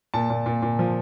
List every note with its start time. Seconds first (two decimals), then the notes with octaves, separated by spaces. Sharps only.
0.14 A#2 A5
0.30 A#2
0.46 A#2
0.62 A#2
0.79 F3